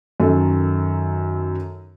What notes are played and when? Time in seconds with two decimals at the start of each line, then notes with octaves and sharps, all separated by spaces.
0.20 F#2 D#3 A4